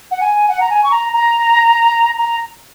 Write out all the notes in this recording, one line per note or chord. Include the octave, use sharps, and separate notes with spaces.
F#5
G#5
F#5
A#5
G#5
C#6
A#5
A#5
A#5